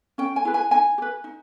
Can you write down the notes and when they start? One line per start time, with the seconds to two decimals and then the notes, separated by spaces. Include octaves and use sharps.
0.18 C#4 G5
0.36 G#5
0.45 E4 G#4 B4
0.54 G#5
0.71 D#4 G#5
0.98 G4
1.02 B4
1.24 D#4